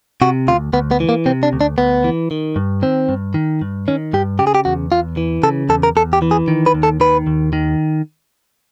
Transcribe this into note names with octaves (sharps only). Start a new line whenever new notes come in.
C3 F#4
D2 F4
D2 B3
B3
E3
A#3
C3 C4
D4
D2
D4
D2 B3
E3
D#3
G2
D#3 C4
G2
D#3
G2
D#3 C#4
G2 G4
C#3 G4
G#4
G4
E2 F#4
E2 F4
E3
C#3 A4
E2 A4
A#4
E2 A4
G4
E3
G#4
D#3
B4
D#2
A4
D#3 B4
D#2
D#3